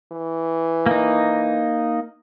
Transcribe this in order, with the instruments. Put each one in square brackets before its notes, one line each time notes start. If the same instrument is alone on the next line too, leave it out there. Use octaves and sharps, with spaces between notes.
[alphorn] E3
[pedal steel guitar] A#3 D#4